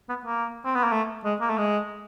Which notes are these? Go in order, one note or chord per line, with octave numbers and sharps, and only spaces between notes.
B3
A#3
C4
B3
A#3
A3
G#3
A#3
A3
G#3